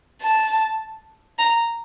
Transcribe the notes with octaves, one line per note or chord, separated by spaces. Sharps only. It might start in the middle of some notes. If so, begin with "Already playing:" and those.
A5
A#5